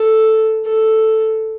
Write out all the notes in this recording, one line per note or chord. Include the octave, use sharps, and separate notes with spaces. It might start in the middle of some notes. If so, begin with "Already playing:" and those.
Already playing: A4
A4